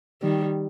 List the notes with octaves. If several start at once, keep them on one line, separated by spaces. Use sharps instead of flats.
D#3 G3